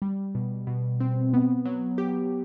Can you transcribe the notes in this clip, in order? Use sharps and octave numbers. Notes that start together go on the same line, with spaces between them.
G3
B2
B2
C4
B3
F#3
G4